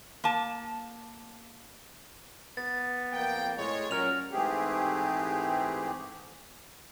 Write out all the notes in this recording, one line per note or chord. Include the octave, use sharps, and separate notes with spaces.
A#3 A5
B3 A6
F2 A#3 G5
A2 G#3 C#5
A#2 F#3 C#4 A#4 F6 F7
G#2 E3 A3 C4 G4 G#4